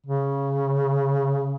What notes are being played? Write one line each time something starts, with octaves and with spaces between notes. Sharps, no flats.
C#3